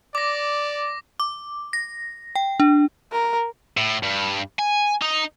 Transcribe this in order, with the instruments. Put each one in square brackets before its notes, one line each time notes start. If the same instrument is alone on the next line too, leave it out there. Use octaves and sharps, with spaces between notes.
[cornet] D5 [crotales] D6 A#6
[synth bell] D6
A#6
G5
D4
[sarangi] A#4
[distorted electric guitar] A2
G2
G#5
D#4